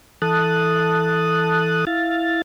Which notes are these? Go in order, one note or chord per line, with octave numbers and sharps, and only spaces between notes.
E3 A4 A5 D#6 F#6
E4 F5 A6